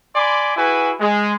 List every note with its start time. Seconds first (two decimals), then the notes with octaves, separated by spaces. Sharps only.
0.15 D5 G#5 B5 C6 D6
0.56 E4 F#4 G#4 B4 G#5
1.00 G#3